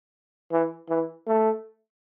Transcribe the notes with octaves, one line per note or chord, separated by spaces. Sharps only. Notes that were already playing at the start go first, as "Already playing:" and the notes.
E3
E3
A3